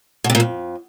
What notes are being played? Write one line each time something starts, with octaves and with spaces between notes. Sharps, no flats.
B2
C3
A#2
F2